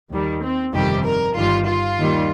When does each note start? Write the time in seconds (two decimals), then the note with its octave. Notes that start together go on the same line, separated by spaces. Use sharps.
0.12 D#2 D#3 G3
0.42 C4
0.73 G1 F2 C3 D#3 G3 G4
1.05 A#4
1.36 G1 G2 D#3 G3 F4
1.67 F4
1.98 D#2 D#3 G3